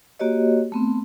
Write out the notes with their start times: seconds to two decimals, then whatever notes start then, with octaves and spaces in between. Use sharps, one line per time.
0.19 A#3 F#4 G4 C#5 D#5
0.72 A3 B3 C4